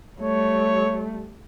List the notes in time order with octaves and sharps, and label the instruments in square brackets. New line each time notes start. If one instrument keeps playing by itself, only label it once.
[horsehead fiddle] G3 A3 [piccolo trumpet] C#5